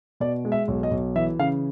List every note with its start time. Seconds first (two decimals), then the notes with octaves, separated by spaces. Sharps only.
0.20 B2 D5
0.45 G#3
0.52 E5
0.68 B1
0.83 D#5
0.91 B1
1.15 E3 E5
1.39 C#3 F5